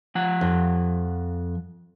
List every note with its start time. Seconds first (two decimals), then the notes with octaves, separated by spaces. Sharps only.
0.15 F3 F#5
0.41 F2